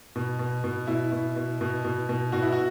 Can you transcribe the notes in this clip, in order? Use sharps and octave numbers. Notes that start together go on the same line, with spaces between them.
B2
B2
B2
B2 E4
B2
B2
B2
B2
B2
B2 F#4
E4
F#4